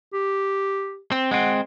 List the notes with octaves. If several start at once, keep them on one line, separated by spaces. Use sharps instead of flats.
G4
C4
G#3 C4 F#5